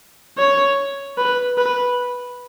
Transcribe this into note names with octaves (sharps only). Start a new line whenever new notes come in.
C#5
B4
B4